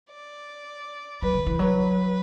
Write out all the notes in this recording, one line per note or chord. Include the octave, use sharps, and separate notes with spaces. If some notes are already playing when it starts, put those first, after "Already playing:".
D5
F#3 B4
D3
E3
F#3 B4